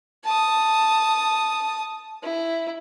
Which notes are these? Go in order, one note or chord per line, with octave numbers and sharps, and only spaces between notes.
A5 D#6
E4